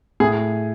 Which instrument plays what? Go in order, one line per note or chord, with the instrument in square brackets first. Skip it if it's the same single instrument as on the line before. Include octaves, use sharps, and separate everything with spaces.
[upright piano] A2 [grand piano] G#4